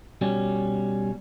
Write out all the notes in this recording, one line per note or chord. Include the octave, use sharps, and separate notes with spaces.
B2 G3 C#4